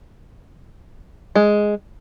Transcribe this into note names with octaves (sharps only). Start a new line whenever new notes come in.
G#3